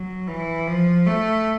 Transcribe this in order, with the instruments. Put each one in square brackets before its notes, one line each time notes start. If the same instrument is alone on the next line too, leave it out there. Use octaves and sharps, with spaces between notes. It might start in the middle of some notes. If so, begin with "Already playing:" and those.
Already playing: [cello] F#3
E3
F3
A3